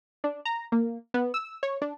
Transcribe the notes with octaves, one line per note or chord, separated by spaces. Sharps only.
D4
A#5
A#3
B3
E6
C#5
D4